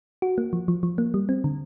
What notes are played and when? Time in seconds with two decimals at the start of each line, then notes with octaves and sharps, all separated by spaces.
0.22 F#4
0.38 A#3
0.53 F3
0.68 F3
0.83 F3
0.98 A#3
1.14 G3
1.29 C4
1.44 D3